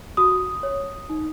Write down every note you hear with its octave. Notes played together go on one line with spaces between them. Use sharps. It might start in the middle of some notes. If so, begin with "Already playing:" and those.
F#4 D#6
C#5
D#4